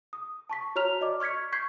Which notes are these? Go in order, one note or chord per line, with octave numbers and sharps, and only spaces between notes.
D#6
A5 C#6 B6
F#4 C#5 A#5 F6 F7
D5 D#5 D6
C#6 F6 G#6 B6 C#7
C#6 G6 G#6 B6 C7